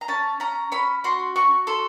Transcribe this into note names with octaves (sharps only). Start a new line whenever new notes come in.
A#5
C#4 A5
C#4 A#5
C#4 B5
F#4 C6
F#4 C#6
A4 C6